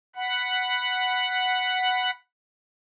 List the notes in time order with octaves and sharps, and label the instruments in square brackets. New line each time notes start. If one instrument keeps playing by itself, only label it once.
[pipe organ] F#5 B5